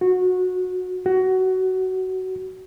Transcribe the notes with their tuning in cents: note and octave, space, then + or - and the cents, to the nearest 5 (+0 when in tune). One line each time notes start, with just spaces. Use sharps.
F#4 -15
F#4 +20